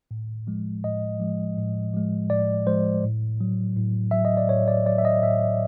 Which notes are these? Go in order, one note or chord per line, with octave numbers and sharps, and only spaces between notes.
A2
F3 G#3
A2 D#5
F3 G#3
A2
F3 G#3
A2 D5
F3 G#3 C5
A2
F#3
A2
F#3 E5
D#5
D5
A2 C#5
D5
F#3 D5
E5
D#5
A2 E5